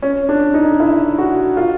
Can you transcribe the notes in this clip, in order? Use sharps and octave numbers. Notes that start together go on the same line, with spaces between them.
C#4
D4
D#4
E4
F#4
F4